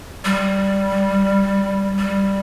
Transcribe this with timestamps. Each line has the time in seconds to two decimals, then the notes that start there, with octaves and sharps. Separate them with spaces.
0.25 G3
1.98 G3